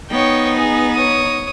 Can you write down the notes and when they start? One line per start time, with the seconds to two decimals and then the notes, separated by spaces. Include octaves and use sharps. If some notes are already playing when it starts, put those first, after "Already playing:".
0.11 B3 D#4 C#5 G5
0.57 G#4
0.94 C#5 D#6